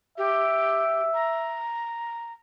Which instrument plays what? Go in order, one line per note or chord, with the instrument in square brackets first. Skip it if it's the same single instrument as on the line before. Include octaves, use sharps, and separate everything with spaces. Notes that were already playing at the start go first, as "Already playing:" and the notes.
[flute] G4 [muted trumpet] E5
[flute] A#5